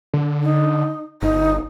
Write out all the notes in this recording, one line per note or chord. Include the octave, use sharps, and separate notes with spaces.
D3
D#4
G1 D#4